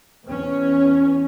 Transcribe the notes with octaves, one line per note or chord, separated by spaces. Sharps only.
E2 C#4